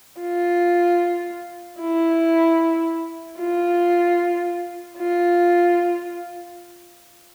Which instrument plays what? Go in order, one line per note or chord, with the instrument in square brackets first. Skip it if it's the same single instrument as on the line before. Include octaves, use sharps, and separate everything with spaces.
[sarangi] F4
E4
F4
F4